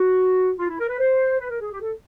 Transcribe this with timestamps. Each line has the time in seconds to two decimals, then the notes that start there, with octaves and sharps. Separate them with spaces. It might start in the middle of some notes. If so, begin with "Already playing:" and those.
Already playing: F#4
0.58 F4
0.69 E4
0.79 A#4
0.89 B4
0.99 C5
1.39 B4
1.50 A#4
1.60 G#4
1.71 G4
1.81 A4